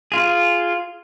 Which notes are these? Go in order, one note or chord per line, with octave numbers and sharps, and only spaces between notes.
F4 G#4